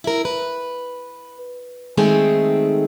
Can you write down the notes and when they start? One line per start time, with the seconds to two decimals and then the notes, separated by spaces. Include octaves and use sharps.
0.04 E4 A#4
0.25 B4
1.97 D#3 G#3 A3 C4 G#4 A4